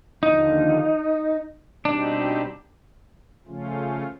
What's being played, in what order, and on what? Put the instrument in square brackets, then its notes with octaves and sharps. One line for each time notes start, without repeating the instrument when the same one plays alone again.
[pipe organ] D#2 D3 F3 [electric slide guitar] D#4
[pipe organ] B2 G3 C4 D#4 G4 [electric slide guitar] D4
[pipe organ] C#3 F3 A3 C#4 F4